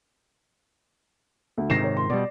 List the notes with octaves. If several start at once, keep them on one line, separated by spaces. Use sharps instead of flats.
D2
G#2 C3 D#3 A#6 C7 E7
C#5
C6
B2 G3 D5